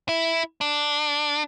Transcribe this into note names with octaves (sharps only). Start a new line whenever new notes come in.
E4
D4